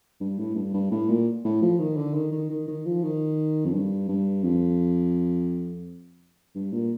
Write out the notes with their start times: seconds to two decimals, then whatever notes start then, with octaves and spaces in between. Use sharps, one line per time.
0.21 G2
0.38 A2
0.56 G2
0.74 G2
0.91 A2
1.09 A#2
1.44 A2
1.62 F3
1.79 D#3
1.97 D3
2.14 D#3
2.32 D#3
2.50 D#3
2.68 D#3
2.85 F3
3.03 D#3
3.66 F2
3.73 G2
4.09 G2
4.44 F2
6.55 G2
6.73 A#2